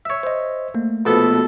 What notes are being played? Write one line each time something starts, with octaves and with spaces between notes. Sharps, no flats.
C#5 E5
C5 D#5
A3 A#3
A#1 B2 B3 A4